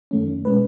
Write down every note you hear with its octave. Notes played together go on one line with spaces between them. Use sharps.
F#2 D#3 A3 C#4
B2 G#3 C#4 B4